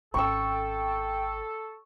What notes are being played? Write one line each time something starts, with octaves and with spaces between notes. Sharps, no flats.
G#1 C#4 A4 G5 C#6 E6